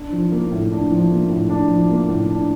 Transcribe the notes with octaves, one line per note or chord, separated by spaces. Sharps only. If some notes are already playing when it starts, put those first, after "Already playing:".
Already playing: D4
F3
A#3
A2
D4
F3
A#3
A2
D4
F3
A#3
A2
D4